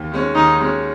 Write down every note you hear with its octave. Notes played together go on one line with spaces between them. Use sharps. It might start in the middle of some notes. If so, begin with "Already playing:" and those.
Already playing: D#2
D#3 G#3 C#4
D#2 D#4
D#3 G#3 C#4